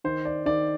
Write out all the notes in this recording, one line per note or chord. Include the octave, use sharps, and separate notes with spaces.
D#3 C5
D5
D#3 D5